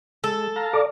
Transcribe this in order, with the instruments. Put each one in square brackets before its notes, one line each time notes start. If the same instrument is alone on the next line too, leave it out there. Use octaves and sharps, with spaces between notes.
[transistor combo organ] G#3 [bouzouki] A4
[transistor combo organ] F5 A5 A#5
[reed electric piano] A4 [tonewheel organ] D5